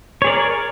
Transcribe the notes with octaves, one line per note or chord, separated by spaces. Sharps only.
G#4 A#4 C#5 D5